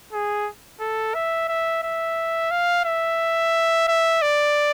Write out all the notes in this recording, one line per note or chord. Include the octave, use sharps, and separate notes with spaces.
G#4
A4
E5
E5
E5
F5
E5
E5
D5